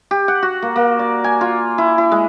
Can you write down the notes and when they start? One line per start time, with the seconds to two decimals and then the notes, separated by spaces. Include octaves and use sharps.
0.11 G4
0.28 F#5
0.42 F#4
0.62 A#3
0.76 A#3
0.99 D5
1.24 G#5
1.41 F4
1.78 E4
1.98 E4
2.11 G#3